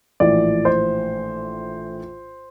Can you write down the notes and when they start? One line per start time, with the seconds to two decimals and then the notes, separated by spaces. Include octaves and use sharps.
0.20 A#1 A2 E3 D5
0.65 C5